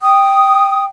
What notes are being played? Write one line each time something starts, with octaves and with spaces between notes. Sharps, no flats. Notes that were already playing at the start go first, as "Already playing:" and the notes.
G5 D#6